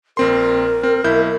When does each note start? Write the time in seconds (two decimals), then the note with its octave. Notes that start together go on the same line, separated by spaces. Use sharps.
0.17 A#1 C4 A#4 C6
0.83 C4
1.04 B1 E4 G6